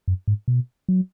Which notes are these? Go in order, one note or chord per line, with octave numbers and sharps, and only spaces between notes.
F#2
G#2
B2
F#3